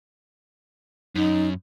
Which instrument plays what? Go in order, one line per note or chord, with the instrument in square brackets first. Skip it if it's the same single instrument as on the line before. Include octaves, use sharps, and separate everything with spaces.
[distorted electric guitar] F#2 [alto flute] D#4